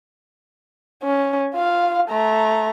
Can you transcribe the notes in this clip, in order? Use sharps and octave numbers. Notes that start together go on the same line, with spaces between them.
C#4
F4 F5
A3 A#5